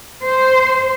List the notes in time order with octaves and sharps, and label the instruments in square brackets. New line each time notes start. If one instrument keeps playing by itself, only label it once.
[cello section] C5